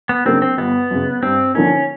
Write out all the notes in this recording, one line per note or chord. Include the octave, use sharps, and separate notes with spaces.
B3
C#3 F#3 A#3 C4 D4
C4
G1 B3
F#2 C#3
G2 C4
D3 F3 A#3 C#4 D#4